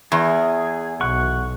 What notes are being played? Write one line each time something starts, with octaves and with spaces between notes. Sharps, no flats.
E2 G#4
B1 F#5 C#6